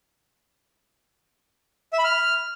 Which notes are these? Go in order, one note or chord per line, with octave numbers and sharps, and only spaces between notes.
E5
B5
F6